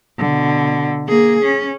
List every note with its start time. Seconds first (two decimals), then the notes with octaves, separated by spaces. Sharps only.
0.18 B2 D3
1.08 A#3 G#4
1.44 C#4